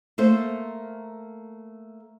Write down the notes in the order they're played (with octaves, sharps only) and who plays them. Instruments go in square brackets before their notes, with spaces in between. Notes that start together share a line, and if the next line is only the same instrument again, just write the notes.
[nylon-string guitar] A3 A#3 A4 C5